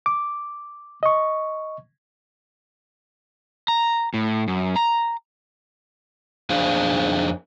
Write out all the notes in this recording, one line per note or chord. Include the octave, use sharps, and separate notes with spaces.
D6
D#5 C#6
A#5
A2
F#2
A#5
F2 D4 G#4 C5 F5